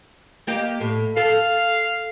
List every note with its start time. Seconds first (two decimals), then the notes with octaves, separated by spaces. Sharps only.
0.47 A#3 G4 D#5
0.80 A2
1.17 A4 F5